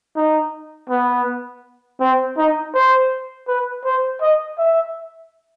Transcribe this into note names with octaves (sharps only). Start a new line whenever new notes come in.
D#4
B3
C4
D#4
C5
B4
C5
D#5
E5